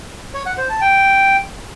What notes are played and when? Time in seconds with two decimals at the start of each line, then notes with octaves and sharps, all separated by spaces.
0.34 C#5
0.46 F#5
0.58 C5
0.69 A5
0.81 G5